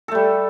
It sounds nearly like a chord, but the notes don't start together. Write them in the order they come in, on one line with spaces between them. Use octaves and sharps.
A4 A3 G3